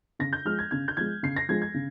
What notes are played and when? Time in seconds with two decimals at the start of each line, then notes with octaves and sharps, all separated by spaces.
0.19 C#3 A#6
0.33 G6
0.45 F3 G#3 F6
0.59 G#6
0.71 C#3 G#6
0.88 G6
0.97 F3 G#3 G#6
1.23 C#3 C7
1.36 A#6
1.49 F3 G#3 G#6
1.62 G#6
1.74 C#3